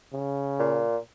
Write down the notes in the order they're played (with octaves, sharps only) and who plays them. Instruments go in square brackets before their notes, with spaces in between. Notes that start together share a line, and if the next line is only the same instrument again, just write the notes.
[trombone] C#3
[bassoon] A#2